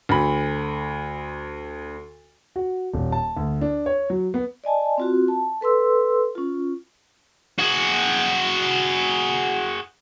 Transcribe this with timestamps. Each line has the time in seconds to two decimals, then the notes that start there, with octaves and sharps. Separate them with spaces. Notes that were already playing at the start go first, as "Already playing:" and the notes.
0.09 D2 B5
2.56 F#4
2.94 D#1
3.12 A5
3.37 D2
3.61 D4
3.86 C#5
4.10 F#3
4.34 B3
4.64 D5 D#5 G#5 A5
4.98 C4 F4 F#4
5.28 A5
5.61 A4 B4 C6 E6
6.35 C#4 F4
7.59 F#4 G#4